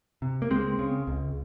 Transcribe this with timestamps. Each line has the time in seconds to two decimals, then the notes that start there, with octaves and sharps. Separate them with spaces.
0.22 C3
0.42 A#3
0.51 C#2 G#3 C4
0.79 C#3
1.07 C#2